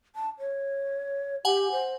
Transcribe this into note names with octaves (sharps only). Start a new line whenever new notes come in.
A5
C#5
G4 F#5 G#5
C5